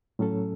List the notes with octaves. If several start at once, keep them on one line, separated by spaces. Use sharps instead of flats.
A2 F#3 C#4 A4